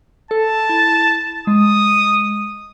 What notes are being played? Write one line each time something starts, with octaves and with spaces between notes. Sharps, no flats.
A4 A5
E4
G#3 D#6